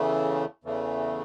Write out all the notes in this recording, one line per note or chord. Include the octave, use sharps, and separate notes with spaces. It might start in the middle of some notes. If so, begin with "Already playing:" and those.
Already playing: E2 C#3 E3 A3
E2 C#3 E3 A3